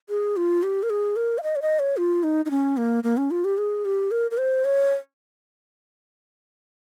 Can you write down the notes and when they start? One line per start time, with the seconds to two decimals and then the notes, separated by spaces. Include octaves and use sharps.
0.09 G#4
0.37 F4
0.63 G4
0.83 A#4
0.90 G#4
1.16 A#4
1.38 F5
1.43 D#5
1.56 C#5
1.62 D#5
1.79 C#5
1.97 F4
2.23 D#4
2.45 D#4
2.51 C#4
2.77 A#3
3.04 A#3
3.17 C#4
3.31 F4
3.45 G4
3.58 G#4
3.85 G4
4.11 A#4
4.31 A#4
4.38 C5
4.65 C#5